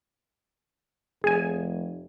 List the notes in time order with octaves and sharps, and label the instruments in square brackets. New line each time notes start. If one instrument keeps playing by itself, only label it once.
[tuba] F1 [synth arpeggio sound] G#4 G#5